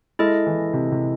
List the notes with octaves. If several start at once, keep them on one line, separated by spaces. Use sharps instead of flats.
G#3 E4 A4 D#5
E3
C3
C3